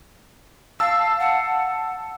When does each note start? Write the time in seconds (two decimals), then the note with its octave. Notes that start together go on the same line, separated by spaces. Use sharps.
0.80 F5 A5 E6
1.19 F#5